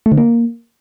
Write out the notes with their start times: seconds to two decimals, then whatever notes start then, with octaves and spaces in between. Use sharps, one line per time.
0.06 A3
0.12 D3
0.18 A#3